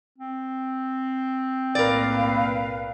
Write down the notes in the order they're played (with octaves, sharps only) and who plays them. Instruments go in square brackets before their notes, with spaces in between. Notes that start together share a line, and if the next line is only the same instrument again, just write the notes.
[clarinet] C4
[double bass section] B1 A2 A#3 [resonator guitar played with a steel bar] A#4 D5 [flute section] B4 F5